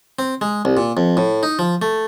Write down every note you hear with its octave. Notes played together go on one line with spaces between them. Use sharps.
C4
G#3
C2
A#2
F2
A2
D#4
F3
A3